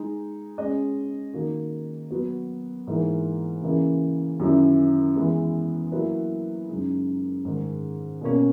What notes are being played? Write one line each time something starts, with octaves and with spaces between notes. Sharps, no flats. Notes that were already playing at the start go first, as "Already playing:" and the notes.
Already playing: G#3 D#4 G#4
G#3 C#4 G#4 D#5
D#3 A#3 D#4 F#4
F#3 B3 F#4
G#2 E3 A#3 D#4
C#3 E3 A#3
F#2 D#3 F#3 C#4 E4
E3 G#3 B3
F#3 A#3 E4 B4
F#2 C#3 G#3 D#4 G#4
G#2 D#3 G#3
B2 A#3 C#4